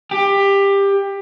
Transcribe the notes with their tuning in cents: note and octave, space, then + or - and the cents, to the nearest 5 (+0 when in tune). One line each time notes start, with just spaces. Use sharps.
G4 +20